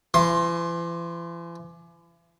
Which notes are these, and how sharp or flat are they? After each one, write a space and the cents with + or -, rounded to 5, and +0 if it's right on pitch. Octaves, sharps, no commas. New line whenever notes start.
E3 +45 C6 +15